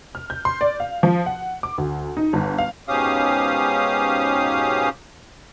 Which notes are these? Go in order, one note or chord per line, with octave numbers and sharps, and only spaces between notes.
F6
G6
C6
D5
F5
F3
F#5
D6
D2
D#4
G1
F5
G#2 B2 C#4 G4 F5 D#6